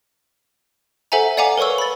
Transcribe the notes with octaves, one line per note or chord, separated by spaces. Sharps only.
A4 C5 E5 F#5 G#5 A#5
D5 F5 F#5 G#5 A#5 D6
A#4 B4 C#5 C#6 E6
B5 A6